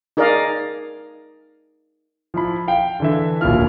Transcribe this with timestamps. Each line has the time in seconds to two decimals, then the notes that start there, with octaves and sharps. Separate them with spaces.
0.17 D#4 G#4 A#4 D5 D#5 F5
2.34 F3 E4 B5
2.68 F5 G5
3.00 D3 E3 E5
3.41 D1 A#1 D#2 E4 F4 F6